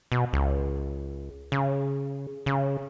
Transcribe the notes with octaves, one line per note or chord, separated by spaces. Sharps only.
B2
C#2
C#3
C#3